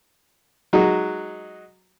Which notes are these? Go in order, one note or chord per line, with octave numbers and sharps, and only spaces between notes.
F#3 G#3 D#4 F#4